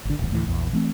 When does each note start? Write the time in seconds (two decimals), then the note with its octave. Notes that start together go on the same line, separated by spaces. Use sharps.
0.05 G#1 D3
0.19 D1 B1 E2
0.31 D2 A2 D#3 E3
0.47 A#1 E2
0.73 E3 A3 C4